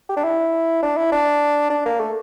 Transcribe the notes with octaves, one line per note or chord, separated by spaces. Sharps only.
G4
D4
E4
D4
E4
D4
D4
A#3
A3